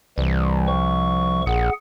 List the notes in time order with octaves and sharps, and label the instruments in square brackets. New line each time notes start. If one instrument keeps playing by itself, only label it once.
[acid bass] C2 [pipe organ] E3 G3
[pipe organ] F3 C#6
[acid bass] A#1 [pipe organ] G#4 F#5